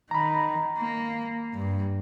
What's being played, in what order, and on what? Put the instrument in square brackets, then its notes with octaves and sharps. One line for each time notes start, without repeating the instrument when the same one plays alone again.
[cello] D#3 [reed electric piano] A#5 B5
[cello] A#3
G2